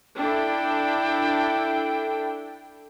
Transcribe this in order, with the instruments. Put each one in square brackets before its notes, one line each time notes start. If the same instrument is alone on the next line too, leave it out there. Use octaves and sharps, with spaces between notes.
[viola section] D4 E4 A4 [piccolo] G5